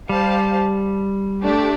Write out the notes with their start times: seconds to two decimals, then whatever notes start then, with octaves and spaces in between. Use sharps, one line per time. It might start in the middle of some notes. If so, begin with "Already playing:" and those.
0.09 G3 G4 C5 F5 A5
1.42 A3 D4 G4 D5